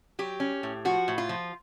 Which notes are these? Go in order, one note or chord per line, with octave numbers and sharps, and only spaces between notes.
F#3 G4
C#4
A2
F3 F#4
A2
F4
F3